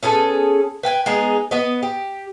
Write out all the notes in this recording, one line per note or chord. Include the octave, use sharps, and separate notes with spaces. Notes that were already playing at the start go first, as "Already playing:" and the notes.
B3 C#4 G#4 A4
B4 G5 G#5
G#3 B3 D#4 G#4
B3 B4 D#5
G4